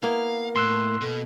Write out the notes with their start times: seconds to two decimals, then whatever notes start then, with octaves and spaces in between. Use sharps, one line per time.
0.03 A#3 B3 E4 A#4 F5
0.56 A2 C6 E6 F#6
1.01 B2 A4